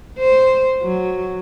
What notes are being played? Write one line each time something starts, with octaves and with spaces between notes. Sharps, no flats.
C5
F#3